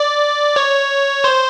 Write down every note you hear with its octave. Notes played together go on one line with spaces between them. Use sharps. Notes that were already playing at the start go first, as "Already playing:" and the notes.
Already playing: D5
C#5
C5